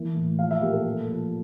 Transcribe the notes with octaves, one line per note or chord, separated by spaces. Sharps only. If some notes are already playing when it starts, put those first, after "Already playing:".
Already playing: E3 A#3
A2
F3 F5
E5
A#2 G4
A4
A3
F3